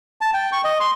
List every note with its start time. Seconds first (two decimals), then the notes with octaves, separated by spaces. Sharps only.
0.21 A5
0.34 G5
0.53 C#6
0.64 D#5
0.80 C6